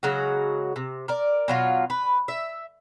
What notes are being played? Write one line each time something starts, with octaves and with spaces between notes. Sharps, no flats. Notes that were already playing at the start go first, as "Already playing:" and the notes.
C#3 F#3 G#3 F#4
C3
A#4 D5
B2 F#3 F4
B4
E5